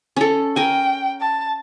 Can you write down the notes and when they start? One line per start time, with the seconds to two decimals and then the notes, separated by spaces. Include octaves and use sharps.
0.16 C#4 A4
0.56 A#4 G5 G#5
1.20 A5